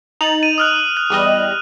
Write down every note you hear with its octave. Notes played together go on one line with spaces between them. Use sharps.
D#4 A6 F7 F#7
D#7
D#6 F6 F#6
F#6
E2 G3 D#5